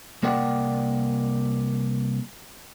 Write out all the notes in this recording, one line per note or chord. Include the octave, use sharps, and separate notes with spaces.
C2 A#3 A#4 D5 F#5 G5